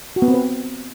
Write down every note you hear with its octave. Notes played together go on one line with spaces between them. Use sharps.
F#4
B3
C4
B4